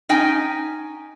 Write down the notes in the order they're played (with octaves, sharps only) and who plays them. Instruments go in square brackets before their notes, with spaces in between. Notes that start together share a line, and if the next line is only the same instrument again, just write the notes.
[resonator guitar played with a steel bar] C#4 D#4 G5 G#5